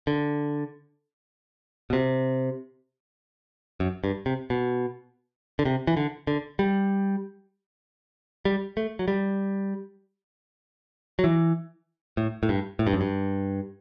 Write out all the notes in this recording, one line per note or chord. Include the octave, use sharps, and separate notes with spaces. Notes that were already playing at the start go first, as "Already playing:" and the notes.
D3
B2
C3
F#2
G2
C3
B2
D3
C3
E3
D3
D3
G3
G3
A3
F#3
G3
F#3
E3
A2
A2
G2
A2
G2
F#2
G2